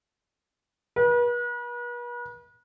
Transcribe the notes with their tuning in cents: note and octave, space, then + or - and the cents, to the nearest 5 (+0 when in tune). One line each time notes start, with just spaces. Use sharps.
B4 -40